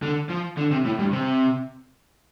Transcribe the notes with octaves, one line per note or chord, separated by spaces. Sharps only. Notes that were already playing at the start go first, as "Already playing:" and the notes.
D3
F3
D3
C3
A2
G2
C3